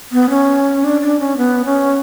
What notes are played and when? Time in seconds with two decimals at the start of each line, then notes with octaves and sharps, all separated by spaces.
0.12 B3
0.30 C#4
0.84 D4
1.01 D4
1.20 C#4
1.37 B3
1.65 C#4